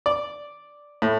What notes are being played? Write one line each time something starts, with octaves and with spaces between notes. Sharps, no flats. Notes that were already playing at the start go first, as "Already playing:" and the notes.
D5
A2